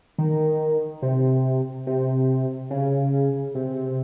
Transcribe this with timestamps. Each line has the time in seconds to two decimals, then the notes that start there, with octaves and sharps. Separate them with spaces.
0.18 D#3
1.02 C3
1.87 C3
2.70 C#3
3.55 C3